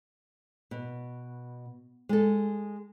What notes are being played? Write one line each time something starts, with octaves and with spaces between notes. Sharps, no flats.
B2
G#3 A4